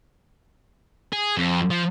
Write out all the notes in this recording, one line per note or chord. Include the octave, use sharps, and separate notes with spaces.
G#4
F2
F3